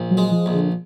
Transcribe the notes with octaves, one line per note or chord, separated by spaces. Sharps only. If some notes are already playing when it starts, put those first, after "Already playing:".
Already playing: A#1
F#3
G#3
F3
A#1
D3